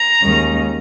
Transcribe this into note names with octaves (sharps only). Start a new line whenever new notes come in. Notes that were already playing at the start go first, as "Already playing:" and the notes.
Already playing: A#5
D#2 D#3 G#3 C#4